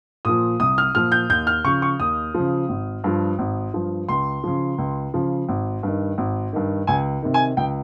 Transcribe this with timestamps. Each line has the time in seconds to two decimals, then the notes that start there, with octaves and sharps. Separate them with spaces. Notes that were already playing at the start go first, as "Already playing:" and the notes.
0.25 A#2 F3 D#6
0.60 C2 D#6
0.78 F6
0.95 A#2 F3 F6
1.12 G6
1.29 D#2 G6
1.47 F6
1.64 C#3 C#6
1.67 F3
1.82 C#6
1.99 D#2 D#6
2.34 C#3 F3
2.69 G#1
3.04 G2 F3
3.39 G#1
3.74 G2 F3
4.08 C#2 C6
4.44 C#3 F3
4.78 C#2
5.14 C#3 F3
5.49 G#1
5.83 G2 D#3
6.18 G#1
6.53 G2 D#3
6.87 C#2 G#5
7.22 C3 D#3
7.34 G#5
7.57 C#2 G5